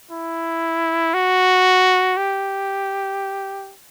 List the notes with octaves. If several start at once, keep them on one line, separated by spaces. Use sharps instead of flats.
E4
F#4
G4